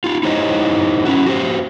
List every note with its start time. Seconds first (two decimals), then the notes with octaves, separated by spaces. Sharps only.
0.04 D#4 F4
0.23 D#4 E4 G4 C5 C#5 D#5
1.05 C#4 E4 F#4
1.26 F#4 G4 C5